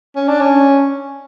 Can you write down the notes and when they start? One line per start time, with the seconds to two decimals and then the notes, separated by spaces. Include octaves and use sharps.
0.16 C#4
0.28 D4
0.41 C#4